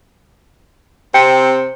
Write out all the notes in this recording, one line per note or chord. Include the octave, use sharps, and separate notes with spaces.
C3 C4 G5 C#7